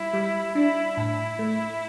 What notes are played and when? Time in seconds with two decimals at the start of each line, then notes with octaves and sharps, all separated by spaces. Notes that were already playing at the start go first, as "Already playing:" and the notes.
Already playing: G3 E4
0.13 G3
0.55 D4 E4
0.97 A2 E4
1.39 A3